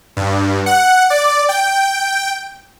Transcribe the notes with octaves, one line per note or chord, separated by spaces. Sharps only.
G2
F#5
D5
G5